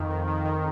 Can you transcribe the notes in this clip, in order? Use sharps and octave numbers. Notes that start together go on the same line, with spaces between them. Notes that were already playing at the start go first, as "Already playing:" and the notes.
Already playing: F2 D#3
D#3
D#3
D#3